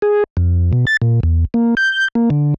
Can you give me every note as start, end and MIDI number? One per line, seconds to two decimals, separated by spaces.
0.02 0.24 68
0.37 0.72 41
0.73 0.85 47
0.87 0.97 93
1.02 1.20 46
1.23 1.45 40
1.54 1.75 58
1.77 2.08 91
2.15 2.30 58
2.30 2.54 50